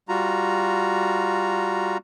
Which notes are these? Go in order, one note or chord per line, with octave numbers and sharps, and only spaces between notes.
G3 F4 F#4 A#5